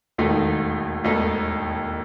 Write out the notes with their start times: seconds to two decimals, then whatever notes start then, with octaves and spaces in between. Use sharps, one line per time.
0.18 E1 D#2 D#3 A3 D#4
1.04 E1 D#2 D#3 A3 D#4